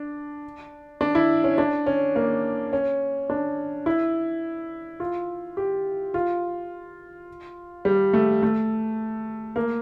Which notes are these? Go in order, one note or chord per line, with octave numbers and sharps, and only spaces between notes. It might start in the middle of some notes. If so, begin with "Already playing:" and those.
Already playing: D4
D4
E4
C#4
D4
C#4
A#3
C#4
D4
E4
F4
G4
F4
G3
A3
A3
A#3